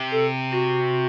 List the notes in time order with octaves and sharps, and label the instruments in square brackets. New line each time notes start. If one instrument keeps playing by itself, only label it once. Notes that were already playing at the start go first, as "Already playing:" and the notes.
Already playing: [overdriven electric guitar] C3
[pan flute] A4
F#4